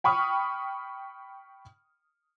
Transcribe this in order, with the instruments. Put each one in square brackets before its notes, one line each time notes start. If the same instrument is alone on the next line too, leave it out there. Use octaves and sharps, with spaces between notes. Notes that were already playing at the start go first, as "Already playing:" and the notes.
[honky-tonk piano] G5 B5 C#6 D#6 F6